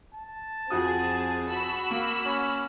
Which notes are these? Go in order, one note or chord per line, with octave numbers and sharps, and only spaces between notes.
A5
F2 C4 F#4 G#4 D#6
F#4 B5 E6
A#3
C#4